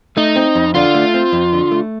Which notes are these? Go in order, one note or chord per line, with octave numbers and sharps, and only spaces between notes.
A3 D#4
C4
F2
D3 F4
A3
C4
F2
D3
A3